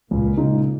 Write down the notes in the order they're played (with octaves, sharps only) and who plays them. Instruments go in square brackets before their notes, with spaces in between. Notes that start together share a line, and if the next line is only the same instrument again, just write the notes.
[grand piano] C#2 [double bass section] A#2
[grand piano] C#3 G#3 D#4